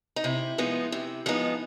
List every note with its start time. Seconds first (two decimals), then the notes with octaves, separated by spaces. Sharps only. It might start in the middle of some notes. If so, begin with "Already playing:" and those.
0.16 D#4
0.24 C3 E4
0.58 F3 G#3 B3 D#4
0.92 C3
1.26 F3 G#3 B3 D#4